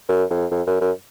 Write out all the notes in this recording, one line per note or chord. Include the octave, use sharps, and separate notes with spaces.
F#2
F2
F2
F#2
F#2